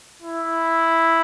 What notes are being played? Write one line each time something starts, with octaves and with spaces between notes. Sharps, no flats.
E4